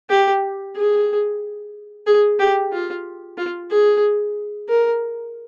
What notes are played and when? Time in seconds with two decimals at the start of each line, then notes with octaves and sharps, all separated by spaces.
0.10 G4
0.76 G#4
2.07 G#4
2.39 G4
2.72 F4
3.38 F4
3.70 G#4
4.69 A#4